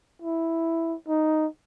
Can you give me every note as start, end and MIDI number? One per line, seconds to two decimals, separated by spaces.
0.22 0.95 64
1.08 1.47 63